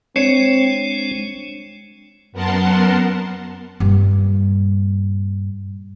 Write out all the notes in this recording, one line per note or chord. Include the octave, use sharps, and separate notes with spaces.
G#3 C4 D4 C#5 C7 C#7 E7
F#2 B3 A#4 F#5 A5 C6
G2 A#2